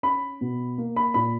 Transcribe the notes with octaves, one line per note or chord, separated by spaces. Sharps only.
C#4 B5
B2
A#3
B5
A#2 B5